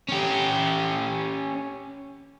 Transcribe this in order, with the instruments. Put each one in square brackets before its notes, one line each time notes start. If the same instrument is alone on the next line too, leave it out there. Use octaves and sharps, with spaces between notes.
[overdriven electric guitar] C#4 G4